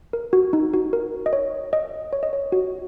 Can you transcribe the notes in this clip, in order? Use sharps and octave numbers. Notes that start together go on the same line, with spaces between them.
A#4
F#4
D#4
F#4
A#4
D#5
C#5
D#5
C#5
D#5
C#5
F#4